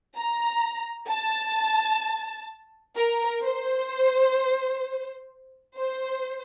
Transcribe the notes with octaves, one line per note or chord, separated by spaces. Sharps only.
A#5
A5
A#4
C5
C5